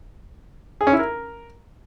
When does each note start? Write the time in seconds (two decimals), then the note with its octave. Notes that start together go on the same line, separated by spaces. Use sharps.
0.81 G#4
0.87 C#4
0.93 E4
0.99 A#4